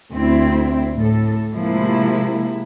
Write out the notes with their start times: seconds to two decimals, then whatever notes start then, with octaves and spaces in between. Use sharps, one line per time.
0.13 D2 C4 E4
0.97 A2 A4
1.56 C3 F3 G#3 A#3 E4